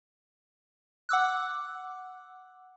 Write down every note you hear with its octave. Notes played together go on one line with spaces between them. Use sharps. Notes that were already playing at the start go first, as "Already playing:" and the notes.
F#5 D6 E6 F#6